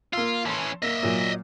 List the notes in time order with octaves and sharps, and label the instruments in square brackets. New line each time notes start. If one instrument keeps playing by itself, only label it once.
[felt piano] A#3 E6 [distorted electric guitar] F4
[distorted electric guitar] E3 C#4 [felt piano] A5 C6
[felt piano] A#3 [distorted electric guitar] D#5 E5
[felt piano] A#2 F#3 A#3